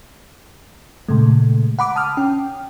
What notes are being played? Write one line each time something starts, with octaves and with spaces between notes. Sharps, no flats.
A#2 C#3 G#3 A3
F#5 B5 D6
A5 D#6 F6
C#4 G5